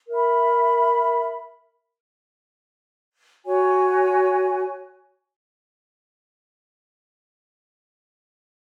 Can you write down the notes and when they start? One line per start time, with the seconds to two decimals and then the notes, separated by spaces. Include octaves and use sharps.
0.08 A#4 E5 B5
3.45 F#4 C#5 G#5